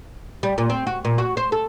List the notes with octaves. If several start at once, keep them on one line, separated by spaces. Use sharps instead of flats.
G3
A#2
C4
F#4
A#2
F#4
C5
A4